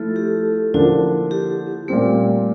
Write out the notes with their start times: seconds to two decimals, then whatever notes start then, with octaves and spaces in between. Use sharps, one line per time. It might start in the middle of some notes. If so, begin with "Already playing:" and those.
Already playing: F3 A3 E4 F4 A4
0.16 G4
0.74 D3 F3 A#3 D4 E4 F4
1.31 G4
1.88 A#2 G3 A3 C4